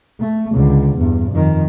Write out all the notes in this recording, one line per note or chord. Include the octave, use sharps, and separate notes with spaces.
A3
C#2 D3
E2 G2
F2 D#3